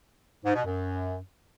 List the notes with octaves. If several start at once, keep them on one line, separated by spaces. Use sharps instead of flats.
G#2
B2
F#2